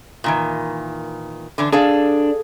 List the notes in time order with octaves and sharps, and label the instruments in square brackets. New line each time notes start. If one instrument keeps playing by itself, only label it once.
[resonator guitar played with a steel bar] A#2 D#3 E3
D3 E3 D4
[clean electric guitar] D4 [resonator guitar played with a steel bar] G#4 A4 F5